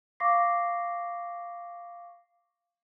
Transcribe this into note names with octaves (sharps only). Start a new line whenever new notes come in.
F5 C#6 D6 A#6 C7